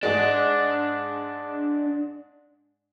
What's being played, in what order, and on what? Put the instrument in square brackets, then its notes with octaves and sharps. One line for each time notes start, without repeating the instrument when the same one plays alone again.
[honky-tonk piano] G#2 G#3 [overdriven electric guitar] D4